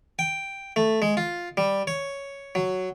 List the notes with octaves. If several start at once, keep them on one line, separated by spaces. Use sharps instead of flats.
G5
A3
G#3
F4
G3
C#5
F#3